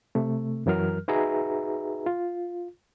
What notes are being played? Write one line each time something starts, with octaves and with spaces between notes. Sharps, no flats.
C3 A3
F#2 E3 F#3 A#4 F6
D#4 F#4 G#4 B4 E5 A#5
F4